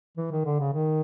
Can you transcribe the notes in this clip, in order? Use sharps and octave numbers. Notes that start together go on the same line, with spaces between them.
E3
D#3
D3
C#3
D#3